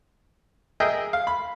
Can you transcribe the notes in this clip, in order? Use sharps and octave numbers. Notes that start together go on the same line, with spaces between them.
G#4 A#4 D#5 E5 G5
F5
B5